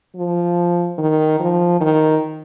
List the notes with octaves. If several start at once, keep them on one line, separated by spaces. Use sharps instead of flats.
F3
D#3
F3
D#3